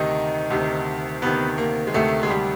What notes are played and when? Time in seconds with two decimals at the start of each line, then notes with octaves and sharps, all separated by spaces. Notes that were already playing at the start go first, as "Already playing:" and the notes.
Already playing: D2 C3 D#3 D#4
0.50 D2 C3 D#3
1.22 D2 C3 D#3 B3
1.58 A#3
1.87 G#3
1.94 D2 C3 D#3 A3
2.23 G#3
2.30 G3